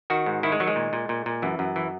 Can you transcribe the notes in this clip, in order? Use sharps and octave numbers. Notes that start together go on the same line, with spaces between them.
D#3 F#4
G#2
D#3 E4
G#3
D#3 F#3
G#3
A#2
A#2
A#2
A#2
F#2 E3
F#2
E3